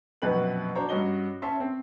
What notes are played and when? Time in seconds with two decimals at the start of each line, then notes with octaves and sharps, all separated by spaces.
0.22 A#1 F#2 B2 F#4 B4 F#7
0.75 D4 F#4 C5 C#5 A#5
0.89 G2 C#4 F#4 D#5 G7
1.42 C#4 E5 A5 C6
1.60 C4